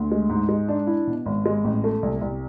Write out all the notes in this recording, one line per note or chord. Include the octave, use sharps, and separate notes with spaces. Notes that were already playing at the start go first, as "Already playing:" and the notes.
Already playing: D2
G#3
G#2
G#3
D4
E4
B2
G#1
G#3
A1
A3
C2
C2